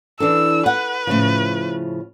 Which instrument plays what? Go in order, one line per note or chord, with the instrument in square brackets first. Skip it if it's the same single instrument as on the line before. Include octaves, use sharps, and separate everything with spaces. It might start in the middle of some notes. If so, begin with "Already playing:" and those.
[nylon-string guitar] E3 D4 A4 [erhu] E6
[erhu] B4 [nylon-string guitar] F#5
[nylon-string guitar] A2 C#3 F3